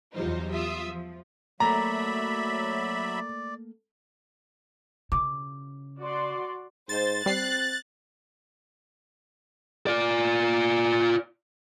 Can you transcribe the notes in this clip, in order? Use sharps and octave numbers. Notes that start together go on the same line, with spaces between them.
E2 F#3 G3 D#4 F4 C5
F4 E5 D#6
F3
F#3 A3 A#3 D5 E5 A#5 B5
C#3 D6
F#4 D5 C6
G#2 C5 A6
G3 C4 F#6 C7
F4 D5